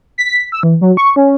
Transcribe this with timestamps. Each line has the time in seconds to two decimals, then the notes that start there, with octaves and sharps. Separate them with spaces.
0.18 B6
0.52 E6
0.63 E3
0.81 F#3
0.97 C#6
1.16 C#4